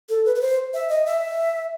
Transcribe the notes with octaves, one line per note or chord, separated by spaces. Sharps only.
A4
B4
B4
C5
E5
D#5
E5